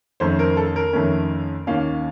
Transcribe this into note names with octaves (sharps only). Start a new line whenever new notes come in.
F2 D#3 A3 C#4 C5
A#4
A4
A#4
F2 D#3 A3 C#4
D#2 D#3 A#3 C#4 F5